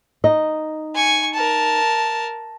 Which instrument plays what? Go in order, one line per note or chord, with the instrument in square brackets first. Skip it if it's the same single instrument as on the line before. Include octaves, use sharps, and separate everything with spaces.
[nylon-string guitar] D#4 D#5
[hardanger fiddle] G#5 C#6
A#4 A5